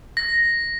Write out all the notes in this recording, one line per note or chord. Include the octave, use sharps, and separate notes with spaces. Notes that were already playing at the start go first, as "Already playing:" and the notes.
A#6